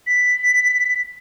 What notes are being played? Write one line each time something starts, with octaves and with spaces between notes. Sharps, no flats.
B6